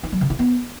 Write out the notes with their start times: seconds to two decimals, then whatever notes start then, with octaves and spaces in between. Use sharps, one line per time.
0.03 D#4
0.12 F#3
0.21 C#3
0.30 E4
0.39 B3